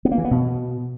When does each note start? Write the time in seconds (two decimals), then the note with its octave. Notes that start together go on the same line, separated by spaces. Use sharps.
0.05 B3
0.11 A#3
0.18 E3
0.24 B3
0.31 B2